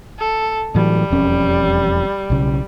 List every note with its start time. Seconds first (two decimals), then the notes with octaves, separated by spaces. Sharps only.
0.19 A4
0.75 A2 E3 F#3 G3
1.10 E1 F2 C#4
2.30 B1 C#3